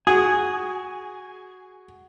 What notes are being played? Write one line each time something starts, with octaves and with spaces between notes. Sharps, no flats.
F#4 G#4 G#5